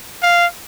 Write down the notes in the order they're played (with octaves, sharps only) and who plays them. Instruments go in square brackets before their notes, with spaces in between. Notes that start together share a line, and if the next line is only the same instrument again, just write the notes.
[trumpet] F5